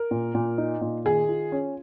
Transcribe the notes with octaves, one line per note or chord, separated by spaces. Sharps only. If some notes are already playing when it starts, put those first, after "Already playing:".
Already playing: A#4
A#2
A#2
D#4
A#2
D#3 G#4
F4
C#4